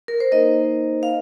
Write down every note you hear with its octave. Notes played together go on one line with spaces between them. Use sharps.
A#4
C5
A#3 D#4 A#4 D#5
F5